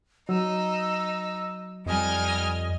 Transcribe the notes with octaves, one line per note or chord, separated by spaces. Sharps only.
F#3 D#4 E6
F2 G3 D#5 G#5 F6